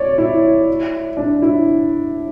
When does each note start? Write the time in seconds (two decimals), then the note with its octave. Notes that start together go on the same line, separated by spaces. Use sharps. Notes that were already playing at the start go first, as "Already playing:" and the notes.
Already playing: C#5 D5
0.18 E4
1.17 D4
1.42 E4